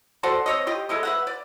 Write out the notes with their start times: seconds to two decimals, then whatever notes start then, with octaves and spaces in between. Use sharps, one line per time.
0.23 F#4 A4 C5 D5
0.46 C4 C#5 D#5
0.67 F4 G4 D#5
0.89 G#3 A3 E4 D#5
1.03 B4 E5 F#5
1.27 D5